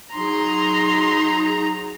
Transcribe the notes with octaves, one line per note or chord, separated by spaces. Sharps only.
F#3 D#4 G#4 A#5 C6